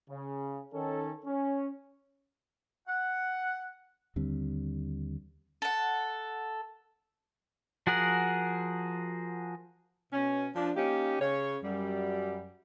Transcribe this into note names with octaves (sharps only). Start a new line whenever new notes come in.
C#3
D#3 C#4 A4
C#4
F#5
D#2 D3 G3 C4
A4 F#5
F3 F#4 G#4 A#4 F#5
B2 C#4
F3 D4
A#3 C#4 D#4 G4
C#3 C#5
F#2 G3